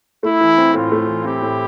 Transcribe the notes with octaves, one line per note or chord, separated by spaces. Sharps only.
A3 E4
E3
C4
A2 F4
A3
E3
C4 E4 G4
A2